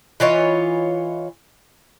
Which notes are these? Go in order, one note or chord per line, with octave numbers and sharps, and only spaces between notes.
E3 F4 C#5 D#5